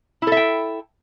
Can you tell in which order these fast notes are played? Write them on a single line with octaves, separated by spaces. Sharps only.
E4 A4 E5 G5